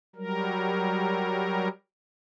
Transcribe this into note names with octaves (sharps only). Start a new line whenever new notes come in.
F#3 G3 A#4